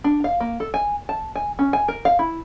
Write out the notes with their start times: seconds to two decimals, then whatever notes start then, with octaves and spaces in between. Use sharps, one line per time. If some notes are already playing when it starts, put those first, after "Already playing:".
0.04 D4
0.24 F5
0.40 A#3
0.60 A4
0.74 G#5
1.09 A5
1.36 G#5
1.59 C#4
1.73 G#5
1.88 A#4
2.05 F5
2.19 E4